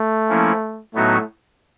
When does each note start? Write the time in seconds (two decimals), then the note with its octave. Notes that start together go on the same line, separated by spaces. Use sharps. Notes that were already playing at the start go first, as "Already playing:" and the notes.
Already playing: A3
0.29 F3 A#3 C#4 E4
0.94 A2 F#3 A3 B3 D#4 F#4